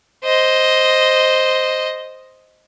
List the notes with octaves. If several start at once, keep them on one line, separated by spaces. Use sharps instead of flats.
C5 D#5